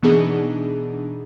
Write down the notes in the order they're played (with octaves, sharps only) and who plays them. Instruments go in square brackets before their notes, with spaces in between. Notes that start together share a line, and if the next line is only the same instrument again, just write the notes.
[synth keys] B2 E3 B3 D4 D#4 G#4